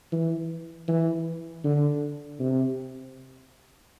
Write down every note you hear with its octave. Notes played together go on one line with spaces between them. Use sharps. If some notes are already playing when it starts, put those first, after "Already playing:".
E3
E3
D3
C3